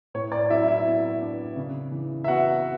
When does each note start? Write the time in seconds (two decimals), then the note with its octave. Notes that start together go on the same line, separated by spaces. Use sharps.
0.14 A2 C#5
0.32 D5
0.46 D5
0.50 F#3 E4 E5
0.67 E4 E5
0.86 B3
1.22 D4
1.56 C#3
1.92 E3
2.24 E5
2.28 B3 F#4 F#5